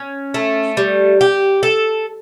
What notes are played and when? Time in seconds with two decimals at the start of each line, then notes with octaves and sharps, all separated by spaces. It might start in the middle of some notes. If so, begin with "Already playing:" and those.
Already playing: C#4
0.34 A3
0.77 G3
1.21 G4
1.63 A4